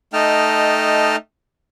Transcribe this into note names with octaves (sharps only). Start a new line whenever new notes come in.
A3 D#4 D#5 G5 A5 F6